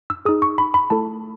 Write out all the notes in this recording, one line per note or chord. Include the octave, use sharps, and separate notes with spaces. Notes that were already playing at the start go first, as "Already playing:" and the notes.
E6
D#4 G#4 D#6
C#6
B5
B5
A3 E4 A4 A5